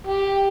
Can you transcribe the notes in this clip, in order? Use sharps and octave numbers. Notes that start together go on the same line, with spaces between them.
G4